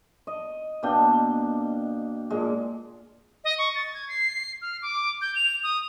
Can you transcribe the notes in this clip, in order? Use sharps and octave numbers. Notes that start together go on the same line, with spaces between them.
D#5
B2 A#3 D4 G5
A#2 G#3
D#5
C#6
A6
G#6
C7
F6
D6
G6
F7
D#6